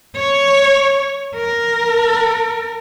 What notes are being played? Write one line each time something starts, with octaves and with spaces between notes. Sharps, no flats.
C#5
A#4